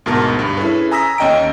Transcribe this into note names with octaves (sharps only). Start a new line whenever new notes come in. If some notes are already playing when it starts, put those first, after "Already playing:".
D2 G#2 B2 A#4 A5
G2
C#4 E4 G#4 A4 B4
G#5 A#5 D#6 E6 A#6 B6
D#2 C#4 D#5 G5 G#5 D7